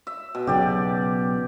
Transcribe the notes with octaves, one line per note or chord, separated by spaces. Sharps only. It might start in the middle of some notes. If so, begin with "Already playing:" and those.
E5
B2
B1 C#3 G4 D5